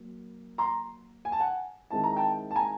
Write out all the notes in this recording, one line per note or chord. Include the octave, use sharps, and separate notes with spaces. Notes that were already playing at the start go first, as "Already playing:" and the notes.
Already playing: F#3 A#3
A#5 C6
G#5
A5
F#5 G#5
D#3 G#3 C4 E4 A5
A#5
G5 A5
A5
G#5 A#5